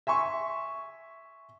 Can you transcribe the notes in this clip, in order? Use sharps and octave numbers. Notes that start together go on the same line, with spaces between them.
E5 G#5 C6 C#6